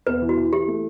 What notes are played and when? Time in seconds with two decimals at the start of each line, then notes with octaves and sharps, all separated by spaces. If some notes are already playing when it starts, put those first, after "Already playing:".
0.07 E2 B4
0.22 E3
0.29 F#4
0.37 E3
0.53 E3 G4
0.68 A3